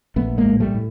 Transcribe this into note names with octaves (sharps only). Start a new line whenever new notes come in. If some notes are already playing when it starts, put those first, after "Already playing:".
A#1 A3 B3
G#3 A#3
A2
G3 A3
A2